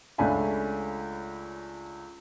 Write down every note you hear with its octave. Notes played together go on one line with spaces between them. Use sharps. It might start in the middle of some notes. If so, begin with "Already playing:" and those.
C#2 A3 C#4 D4 G#5 B5